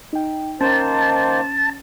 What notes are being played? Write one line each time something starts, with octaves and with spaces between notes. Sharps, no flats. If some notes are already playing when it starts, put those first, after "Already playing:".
D#4 G5
D#3 A#3 C#4 C5 A5